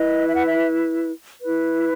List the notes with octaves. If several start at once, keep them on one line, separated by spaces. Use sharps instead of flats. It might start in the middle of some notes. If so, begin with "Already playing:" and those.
Already playing: E4 B4 D#5
E5
F#5
E5
E4 B4